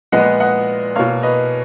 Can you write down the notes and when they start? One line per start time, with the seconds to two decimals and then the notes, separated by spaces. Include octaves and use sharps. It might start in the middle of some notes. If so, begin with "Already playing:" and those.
0.12 A#2 F3 G#3 B3 D#5 F#5
0.40 D#5 F#5
0.95 B2 A#3 C#5 F5
1.23 B4 D#5